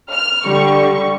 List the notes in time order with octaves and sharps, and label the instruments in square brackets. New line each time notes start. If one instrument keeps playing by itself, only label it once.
[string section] F6
D3 G3 C#6